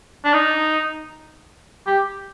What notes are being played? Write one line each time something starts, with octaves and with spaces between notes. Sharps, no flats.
D4
D#4
G4